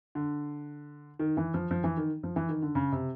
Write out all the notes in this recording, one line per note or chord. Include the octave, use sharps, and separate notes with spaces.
D3
D#3
E3
F3
F3
E3
D#3
F3
E3
D#3
D3
C#3
C3